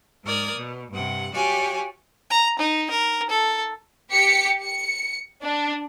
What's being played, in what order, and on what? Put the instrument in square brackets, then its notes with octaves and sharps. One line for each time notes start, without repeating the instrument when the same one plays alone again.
[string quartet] G#2 A#4 D5 D#6 G#6
B2
G2 C3 F#5
F#4 G4 C#5 D5 F5 G#5
[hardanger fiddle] A#5
D#4
A#4
A4
[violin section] G4 B6 C#7
C#7
D4